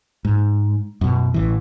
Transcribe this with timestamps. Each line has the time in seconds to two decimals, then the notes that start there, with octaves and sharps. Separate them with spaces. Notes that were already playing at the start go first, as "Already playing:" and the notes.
0.25 G#2
1.01 F#2 B2
1.34 A1 E3